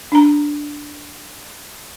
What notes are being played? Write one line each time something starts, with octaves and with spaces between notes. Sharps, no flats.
D4 A#5